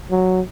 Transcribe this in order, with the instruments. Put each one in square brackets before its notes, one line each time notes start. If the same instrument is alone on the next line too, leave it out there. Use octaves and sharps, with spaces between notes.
[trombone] F#3